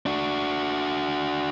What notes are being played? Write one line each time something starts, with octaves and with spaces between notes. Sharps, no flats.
D4 F#4